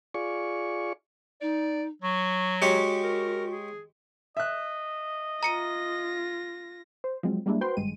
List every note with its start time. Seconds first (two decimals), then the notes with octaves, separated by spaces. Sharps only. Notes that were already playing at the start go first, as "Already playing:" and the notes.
0.14 F4 G#4 D5 C#6
1.41 D#4 D5
2.02 F#3 C#6
2.62 G#3 F#4 G4 C#5
3.03 A#4
3.52 G#4
4.37 D#5 E5 F#6
5.43 F4 A#5 A#6 C#7 D#7
7.04 C5
7.23 F3 F#3 G#3 C4
7.46 G3 G#3 A#3 D4 E4
7.61 F#4 B4 C5 G5 C6
7.77 G#1 G2 G#3 D#7